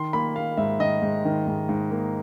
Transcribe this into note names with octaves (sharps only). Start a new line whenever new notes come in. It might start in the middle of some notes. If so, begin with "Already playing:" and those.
Already playing: D#3 C6
A#3 B5
A#3 F5
G#2 E5
D#3 D#5
G#2
D#3
G#2
G#2
A#3